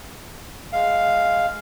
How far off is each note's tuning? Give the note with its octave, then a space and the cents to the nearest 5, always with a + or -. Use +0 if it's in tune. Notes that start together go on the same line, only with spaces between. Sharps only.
G#3 +0 F5 +0